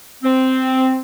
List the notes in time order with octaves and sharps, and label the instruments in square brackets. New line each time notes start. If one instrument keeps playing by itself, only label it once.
[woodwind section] C4